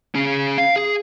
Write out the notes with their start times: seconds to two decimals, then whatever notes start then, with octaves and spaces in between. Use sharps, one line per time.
0.15 C#4 G#4
0.58 F5
0.76 G#4